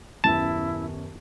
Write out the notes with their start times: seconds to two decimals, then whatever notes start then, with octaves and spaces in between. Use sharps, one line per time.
0.24 D#1 F#2 B3 E4 A5